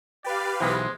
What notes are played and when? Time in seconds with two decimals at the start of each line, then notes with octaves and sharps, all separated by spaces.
0.24 G4 B4 D5 F5
0.60 B1 E3 G#3 C5 C6 D#6